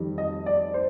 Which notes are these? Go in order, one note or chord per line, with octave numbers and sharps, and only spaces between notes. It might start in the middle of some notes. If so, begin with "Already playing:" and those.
Already playing: F2 D#3 G3
D#5
D5
C5